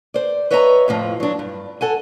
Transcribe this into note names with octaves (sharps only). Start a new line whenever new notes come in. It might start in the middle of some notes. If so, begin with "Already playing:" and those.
C5 D5
B4 C#5 D#5 E5 G5 A#5
F2 A2 F3
F#3 D4
G2
A4 F#5 G#5